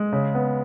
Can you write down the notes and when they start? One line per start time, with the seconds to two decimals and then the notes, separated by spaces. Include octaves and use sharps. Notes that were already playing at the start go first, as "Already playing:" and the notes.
Already playing: G#3
0.13 C#3
0.35 B3